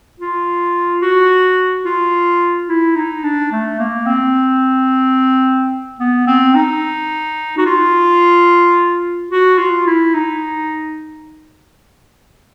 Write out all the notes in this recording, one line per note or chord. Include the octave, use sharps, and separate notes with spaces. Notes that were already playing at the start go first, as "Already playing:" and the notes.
F4
F#4
F4
E4
D#4
D4
A3
A#3
C4
B3
C4
D#4
F#4
F4
F#4
F4
E4
D#4